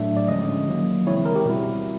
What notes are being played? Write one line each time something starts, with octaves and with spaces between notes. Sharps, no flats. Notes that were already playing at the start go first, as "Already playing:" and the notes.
Already playing: A2 F#3 A3 D4 E5
D5
D3 F3 G#3 C#4 D#5
D#3 F#3 A#3
C#3 E3 G#3 C4 E4 C#5
A#4
G4
B2 G3 C4 E4 F#4